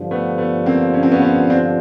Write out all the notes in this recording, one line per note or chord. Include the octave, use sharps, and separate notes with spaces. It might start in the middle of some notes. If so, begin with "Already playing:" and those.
Already playing: G2 D3 F3
A3 B3
A3 B3
A#3 C4
C#4
C4
B3 C#4
B3 C#4
C4 D4